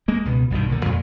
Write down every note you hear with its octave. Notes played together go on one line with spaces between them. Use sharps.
G#3 A#3
C#2 B2 F3 B3
C2 G2 B2 D#3
C2 A#2 D3 D#3
F2 A#2 G#3